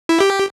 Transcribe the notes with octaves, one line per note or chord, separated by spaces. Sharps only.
E4
G4